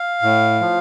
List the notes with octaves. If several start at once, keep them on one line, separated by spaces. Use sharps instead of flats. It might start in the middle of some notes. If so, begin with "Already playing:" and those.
Already playing: F5
A2
F3